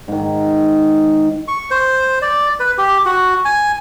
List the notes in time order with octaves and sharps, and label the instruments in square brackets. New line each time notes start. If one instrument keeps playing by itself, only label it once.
[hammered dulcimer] G#2 D#3
[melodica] C#6
C5
D5
B4
G4
F#4
G#5